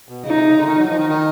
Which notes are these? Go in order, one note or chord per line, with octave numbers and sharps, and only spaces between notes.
B2
C#3 D#4
C3
C#3
D3
D#3
F#3
F3 D#4
D#3
D#3